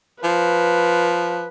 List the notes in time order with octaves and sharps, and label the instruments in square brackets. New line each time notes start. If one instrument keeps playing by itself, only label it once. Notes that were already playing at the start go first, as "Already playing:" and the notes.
[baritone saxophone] F3 [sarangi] B4